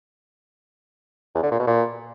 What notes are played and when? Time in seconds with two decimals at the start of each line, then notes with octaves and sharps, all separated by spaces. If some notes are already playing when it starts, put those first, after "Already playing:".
1.35 E2
1.43 D3
1.51 A#2
1.59 B2
1.67 A#2